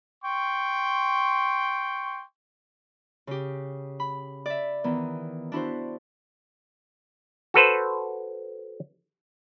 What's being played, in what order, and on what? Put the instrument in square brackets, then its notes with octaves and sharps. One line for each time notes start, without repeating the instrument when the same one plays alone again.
[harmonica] G5 C6 C#6
[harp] C#3 G4
B5
D5 E5
D#3 E3 B3
D4 E4 F#4 C5
[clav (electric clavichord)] F#4 A4 B4 C5